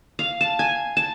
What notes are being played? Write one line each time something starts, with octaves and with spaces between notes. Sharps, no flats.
F5
A5
G#5
A5